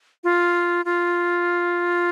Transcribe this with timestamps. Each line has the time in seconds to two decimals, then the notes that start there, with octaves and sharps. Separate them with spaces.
0.24 F4
0.85 F4